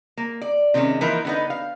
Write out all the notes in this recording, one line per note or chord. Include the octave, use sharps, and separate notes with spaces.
A#3
D5
C3 D#3 G#3 B3 C#4
E3 F3 A#3 D#4 A#4
D3 B3 D#4
F5